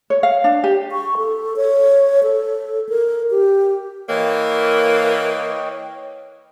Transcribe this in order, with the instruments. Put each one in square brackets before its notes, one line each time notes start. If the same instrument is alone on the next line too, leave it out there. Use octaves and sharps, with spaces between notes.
[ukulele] C#5
F5
D4
G4
[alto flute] C#6
A4
C#5
A4
A#4
G4
[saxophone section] E3 A#3 [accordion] C#5 D#5 G5